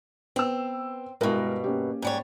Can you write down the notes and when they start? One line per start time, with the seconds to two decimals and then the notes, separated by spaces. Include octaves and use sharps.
0.36 B3 C4 E6
1.21 G2 B2 G#3 E4 A#4
1.64 A#3 C#4 G4
2.02 G#2 G3 C#5